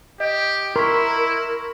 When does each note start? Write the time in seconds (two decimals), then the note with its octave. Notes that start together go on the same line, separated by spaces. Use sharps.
0.20 G4 D#5
0.76 E4 A#4 C6 C#6 B6